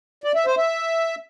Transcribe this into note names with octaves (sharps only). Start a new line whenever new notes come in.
D5
E5
C5
E5